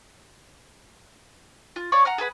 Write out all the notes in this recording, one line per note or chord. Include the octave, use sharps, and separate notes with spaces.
F4
C#5 D5 F5 C#6
F#5 A#5 F6
G#4 A4 B4 F#5